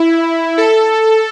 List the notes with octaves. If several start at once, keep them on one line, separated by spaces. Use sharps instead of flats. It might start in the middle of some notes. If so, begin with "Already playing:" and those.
Already playing: E4
A4